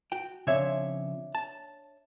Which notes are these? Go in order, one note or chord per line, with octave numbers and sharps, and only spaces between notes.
F#4 G5
C#3 F3 C4 D4 C#5 E5
A5